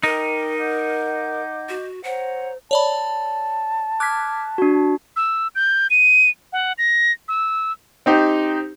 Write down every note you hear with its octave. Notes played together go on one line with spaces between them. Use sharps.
D#4 A#4 G5 D6
D#5 F#5 D6 G6
F#4
C5 C#5 F#5 A#5
C#5 D5 A5 B5
D6 F6 F#6 G#6 B6
D4 F#4
E6
G6
D#7
F#5
A#6
E6
C4 D#4 G4